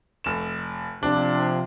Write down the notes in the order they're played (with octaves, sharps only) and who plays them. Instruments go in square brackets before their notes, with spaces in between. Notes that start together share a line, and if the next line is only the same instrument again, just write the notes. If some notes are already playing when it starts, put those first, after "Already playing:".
[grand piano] F1 E7
[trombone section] C3 F3 [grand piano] D4